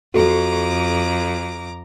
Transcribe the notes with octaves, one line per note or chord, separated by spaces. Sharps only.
F2 F#4 A4 A#5 D6